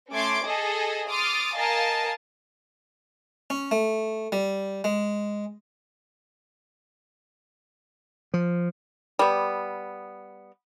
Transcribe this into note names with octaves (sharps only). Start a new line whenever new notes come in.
A3 C#4 C6 D6 G#6 D7
G#4 A4 D#5
C6 D6 D#6 F6 A6
A#4 D#5 F5 G#5 A5
C#4
A3
G3
G#3
F3
G3 B3